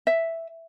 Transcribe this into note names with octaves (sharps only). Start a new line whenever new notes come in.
E5